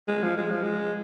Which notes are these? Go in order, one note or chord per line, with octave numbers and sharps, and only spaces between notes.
G#3
F3
G#3
F3
G#3